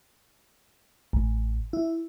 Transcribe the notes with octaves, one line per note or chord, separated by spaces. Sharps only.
A1
E4